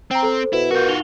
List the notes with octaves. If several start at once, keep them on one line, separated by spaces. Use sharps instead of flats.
C4 G5 A#5
A4 C5
B2 E4
F4 F#4 A#4 G6
D#4 F7 G7